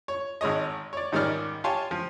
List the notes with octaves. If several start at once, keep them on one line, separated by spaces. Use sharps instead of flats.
C#5
G#1 G#3 C#5 D#5
C#5 D5
G#2 D#3 G3 C#4 D5 F6
F4 G4 C#5 G#5 A5 C6
F3